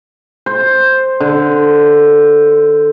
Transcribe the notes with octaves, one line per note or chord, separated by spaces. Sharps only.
C5
D3